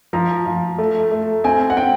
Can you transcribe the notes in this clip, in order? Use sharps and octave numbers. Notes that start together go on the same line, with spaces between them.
F3 A#5
F3
A3
A3
C4 G#5
F#5
C4 G5